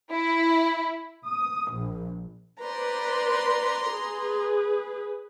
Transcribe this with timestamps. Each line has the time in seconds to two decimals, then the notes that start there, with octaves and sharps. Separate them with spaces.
0.12 E4
1.27 D#6
1.71 A#1
2.60 B4 C5 D5 A#5 C6
3.91 G#4 B4